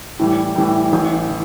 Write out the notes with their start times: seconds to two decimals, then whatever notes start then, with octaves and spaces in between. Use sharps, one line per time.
0.19 A2 E3 G3
0.56 A2 E3 G3
0.92 A1 A2 E3
1.29 E3